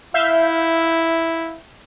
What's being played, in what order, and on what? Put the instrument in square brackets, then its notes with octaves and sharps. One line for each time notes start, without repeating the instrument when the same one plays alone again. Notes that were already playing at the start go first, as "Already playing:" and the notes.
[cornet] E4 [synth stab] E5 F5 G6